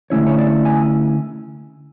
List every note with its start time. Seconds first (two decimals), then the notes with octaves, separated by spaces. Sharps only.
0.10 D3 A3 C#4 E4 C#5
0.27 C#5
0.38 D5
0.65 G#5